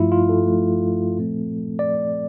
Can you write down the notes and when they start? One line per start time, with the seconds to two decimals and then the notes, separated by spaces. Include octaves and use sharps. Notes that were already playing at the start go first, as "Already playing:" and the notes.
Already playing: G2 F3 A3 E4 F4
0.12 F4
0.29 A4
0.47 G2 F3 A3
1.17 A#2 F3 A3 C4
1.79 D5